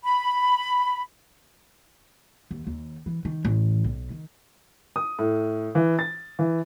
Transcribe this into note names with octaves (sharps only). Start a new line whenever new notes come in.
B5
D#2
D#2
E3
D#3
A1
B1
D#3
D#6
A2
E3
A6
E3